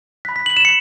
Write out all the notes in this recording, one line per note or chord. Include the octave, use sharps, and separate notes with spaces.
B5 F#6 B6
B6
F#7
E7
C#7